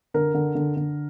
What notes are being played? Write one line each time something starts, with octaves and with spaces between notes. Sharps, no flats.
D3 A#4
D3
D3
D3